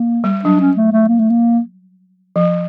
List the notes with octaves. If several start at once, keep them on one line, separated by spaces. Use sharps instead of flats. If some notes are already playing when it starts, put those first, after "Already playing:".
Already playing: A#3
G3
F#3 D4
C#4
A3
A3
A#3
A3
A#3
F3